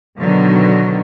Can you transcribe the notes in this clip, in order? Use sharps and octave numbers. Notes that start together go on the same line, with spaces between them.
B2 D3 D#3 F#3